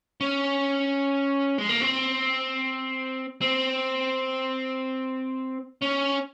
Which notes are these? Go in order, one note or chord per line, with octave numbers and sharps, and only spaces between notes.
C#4
G#3
A#3
C4
C4
C#4